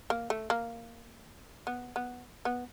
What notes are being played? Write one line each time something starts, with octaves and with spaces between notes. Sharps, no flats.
A#3
A3
A#3
B3
B3
B3